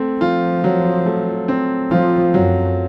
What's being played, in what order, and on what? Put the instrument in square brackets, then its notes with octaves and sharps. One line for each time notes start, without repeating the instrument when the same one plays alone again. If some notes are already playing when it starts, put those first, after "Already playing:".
Already playing: [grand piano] A3 C4
[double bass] F3 [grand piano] F4
[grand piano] F#3
A3
C4
[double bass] F3 [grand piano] F4
[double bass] F#2 [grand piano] F#3